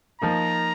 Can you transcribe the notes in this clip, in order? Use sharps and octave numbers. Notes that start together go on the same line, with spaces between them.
F3 A#3 D#4 A#5